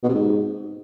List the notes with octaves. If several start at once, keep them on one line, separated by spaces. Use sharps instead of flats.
B2
C3
G#2